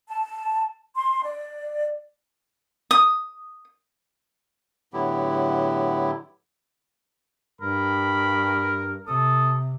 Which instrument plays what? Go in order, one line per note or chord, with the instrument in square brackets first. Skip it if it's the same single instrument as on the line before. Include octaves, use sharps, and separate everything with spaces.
[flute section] A5
C6
D5
[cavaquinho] D#6
[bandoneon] A2 D3 F#3 B3 E4 G4
[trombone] G2 [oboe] A#4 [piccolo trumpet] B5
[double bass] C3 [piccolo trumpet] A4 [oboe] D#6